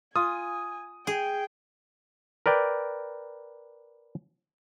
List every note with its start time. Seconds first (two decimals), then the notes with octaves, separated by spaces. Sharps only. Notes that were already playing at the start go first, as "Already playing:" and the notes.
0.16 F4 G#5 D#6
1.07 G#4 G5
2.46 A#4 B4 D5 G5